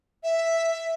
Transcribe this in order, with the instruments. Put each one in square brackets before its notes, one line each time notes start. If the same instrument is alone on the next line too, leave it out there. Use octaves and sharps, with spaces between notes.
[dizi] E5